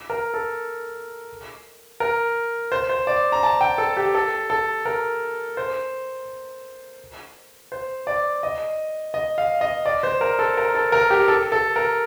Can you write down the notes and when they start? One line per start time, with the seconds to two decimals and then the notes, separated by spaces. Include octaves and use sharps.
0.10 A#4
0.34 A4
2.00 A#4
2.72 C5
2.89 C5
3.07 D5
3.32 A#5
3.43 A5
3.61 G5
3.78 A4
3.97 G4
4.15 A4
4.50 A4
4.85 A#4
5.57 C5
7.72 C5
8.07 D5
8.43 D#5
9.14 D#5
9.38 F5
9.61 D#5
9.86 D5
10.03 C5
10.21 A#4
10.39 A4
10.57 A#4
10.75 A4
10.92 A#4
11.10 G4
11.28 A4
11.52 A4
11.76 A#4